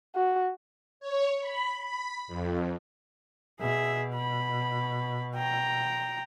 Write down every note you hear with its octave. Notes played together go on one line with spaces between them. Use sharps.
F#4
C#5
B5
B5
F2
B2 G#4 E5
B5
G5 A#5